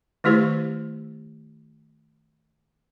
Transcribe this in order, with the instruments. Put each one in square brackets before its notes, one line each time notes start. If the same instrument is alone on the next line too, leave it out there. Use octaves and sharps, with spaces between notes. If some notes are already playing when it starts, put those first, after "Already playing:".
[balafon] D#3 A3 E4 G4 C5